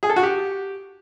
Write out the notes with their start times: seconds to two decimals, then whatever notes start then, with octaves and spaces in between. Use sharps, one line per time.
0.03 G#4
0.10 A4
0.16 F#4
0.23 G4